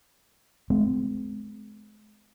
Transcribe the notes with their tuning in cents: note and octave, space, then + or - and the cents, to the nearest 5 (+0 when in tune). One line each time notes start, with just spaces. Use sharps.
G#3 +35 C4 -30